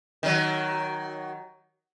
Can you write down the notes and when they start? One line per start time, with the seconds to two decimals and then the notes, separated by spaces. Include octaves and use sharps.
0.23 D#3 F#3